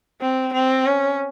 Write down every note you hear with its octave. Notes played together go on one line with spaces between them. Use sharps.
C4
C4
C#4